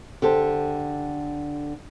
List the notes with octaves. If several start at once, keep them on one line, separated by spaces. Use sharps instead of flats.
D3 G4 A4 C5